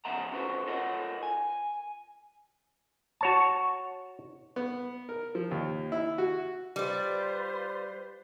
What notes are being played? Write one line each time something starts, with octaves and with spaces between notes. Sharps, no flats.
C#3 F3 B3 E5 F#5 A#5
C#4 F4 F#4 G#4 B4 C5
F4 A4 A#4 C#5 D#5 F#5
G#5
F#4 C#5 A5
B3
A#4
F3
D#2
E4
F#4
G3 F4 B4 C5 D5